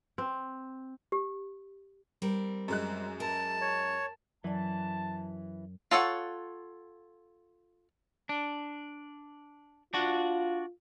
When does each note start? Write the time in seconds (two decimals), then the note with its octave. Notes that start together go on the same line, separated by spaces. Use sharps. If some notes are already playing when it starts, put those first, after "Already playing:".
0.18 C4
1.12 G4
2.22 G3 C4 A#4
2.68 F#2 G#3 F#6
3.20 A#4 A5
3.61 C#5
4.44 F#2 E3 F#3 D5 A5
5.91 F4 A4 C#5 F5 F#5
8.29 D4
9.94 D4 F4 F#4